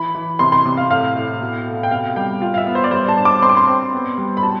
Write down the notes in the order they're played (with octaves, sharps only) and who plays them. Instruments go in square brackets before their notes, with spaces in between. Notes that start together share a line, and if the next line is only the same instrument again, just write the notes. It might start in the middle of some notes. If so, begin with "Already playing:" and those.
Already playing: [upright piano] E3 B5
E3
C3 C6
C6
C3
F5
A2 F5
A2
B2
A3
G5
C3 F5
G3 G5
F4 F5
F5
E5
B3
C5
D5
G3 C5
A5
D4
D6
C4 C6
D6
C6
C4
B3
G3
B5
B2 A5